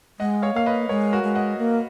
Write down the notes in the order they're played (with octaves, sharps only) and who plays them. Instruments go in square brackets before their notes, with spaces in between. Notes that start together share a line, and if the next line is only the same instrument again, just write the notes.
[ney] G#3 [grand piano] D#5 F#5
[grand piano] C#5 F5
[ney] A#3 [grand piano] F5
[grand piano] B4 D#5
[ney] G#3 [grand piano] A#4 C#5
[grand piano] F#4 A#4
[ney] G#3
[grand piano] D#5 F#5
[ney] A#3